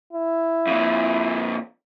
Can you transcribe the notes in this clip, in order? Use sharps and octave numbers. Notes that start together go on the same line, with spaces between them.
E4
F2 A#2